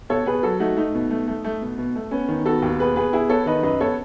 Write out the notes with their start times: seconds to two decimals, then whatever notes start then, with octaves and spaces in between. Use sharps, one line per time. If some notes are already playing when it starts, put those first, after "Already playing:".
0.09 B2 A4 C#5
0.26 B2 G#4 B4
0.43 F#3 F#4 A4
0.60 A3 D#4 F#4
0.77 A3 D#4
0.95 B2
1.10 A3
1.28 A3
1.44 A3
1.62 B2
1.78 B2
1.96 A3
2.11 B3 C#4
2.29 D#3
2.46 B3 F#4 A4
2.62 D#2
2.80 B2 G#4 B4
2.96 B2 G#4 B4
3.13 B2 E4 G#4
3.29 B3 A4 C#5
3.46 D#3 B4 D#5
3.63 F#2 B4 D#5
3.80 B3 A4 C#5